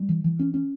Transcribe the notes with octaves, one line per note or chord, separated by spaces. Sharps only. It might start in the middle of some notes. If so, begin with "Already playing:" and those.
Already playing: G3
E3
E3
C#4
C#4